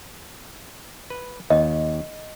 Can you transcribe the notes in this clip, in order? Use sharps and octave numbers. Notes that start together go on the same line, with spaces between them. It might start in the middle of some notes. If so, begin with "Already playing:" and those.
B4
D#2 D#5